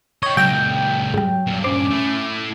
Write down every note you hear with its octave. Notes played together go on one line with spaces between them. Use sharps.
C#5 D#5 G5
C#2 A#2 F#3 G5 E6 A#6
G#2 F#3 G3
G2 A#2
C#4 C5 D6
A3 E4